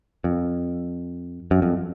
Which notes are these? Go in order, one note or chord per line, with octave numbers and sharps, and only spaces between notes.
F2
F#2
F2